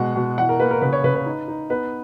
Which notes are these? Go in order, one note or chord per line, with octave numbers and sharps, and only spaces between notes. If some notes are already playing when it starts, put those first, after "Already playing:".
Already playing: B2 G#3 F#5
B2
E3 F#5
A#4
A#3 B4
A#4
C#3 B4
C#5
C#3 B4
B4
D#4
D#4
B3 B4